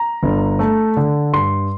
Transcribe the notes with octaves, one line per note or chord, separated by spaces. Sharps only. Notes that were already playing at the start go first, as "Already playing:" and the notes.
Already playing: A#5
G1
A3
D3
G2 C6